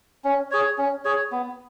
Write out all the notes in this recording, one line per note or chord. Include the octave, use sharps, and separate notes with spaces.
C#4
G#4 C#5
C#4
G#4 C#5
B3